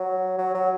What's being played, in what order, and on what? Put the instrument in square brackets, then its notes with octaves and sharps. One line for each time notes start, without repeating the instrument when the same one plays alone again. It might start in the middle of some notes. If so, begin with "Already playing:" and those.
Already playing: [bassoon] F#3
F#3
F#3